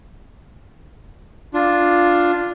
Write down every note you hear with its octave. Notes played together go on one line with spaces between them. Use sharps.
D4 F4